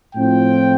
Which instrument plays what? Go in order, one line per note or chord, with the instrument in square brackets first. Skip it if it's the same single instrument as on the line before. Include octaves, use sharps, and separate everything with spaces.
[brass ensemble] A2 F3 C4 G5